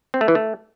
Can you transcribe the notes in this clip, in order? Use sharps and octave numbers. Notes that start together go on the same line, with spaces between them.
C4
A3
E3
A3